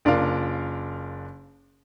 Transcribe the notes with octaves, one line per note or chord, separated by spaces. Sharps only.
F#1 D4 F4 A#4 F5